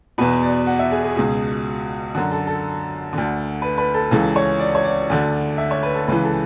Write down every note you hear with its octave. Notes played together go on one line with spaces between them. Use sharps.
E2 B2 B4
D5
F#5
E5
G#4
G#4
C#2 B2 G#4
F#2 D3 F#4
A4
A4
D2 D3
B4
B4
A4
C#2 C#3 E3 A4
C#5
D5
C#5
D5
D2 D3
E5
C#5
B4
A4
C#2 C#3 E3 B4
A4